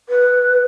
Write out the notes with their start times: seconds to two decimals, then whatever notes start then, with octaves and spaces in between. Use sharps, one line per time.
0.09 B4